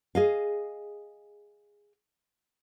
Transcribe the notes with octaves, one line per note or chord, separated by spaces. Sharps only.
G#4 D#5 F5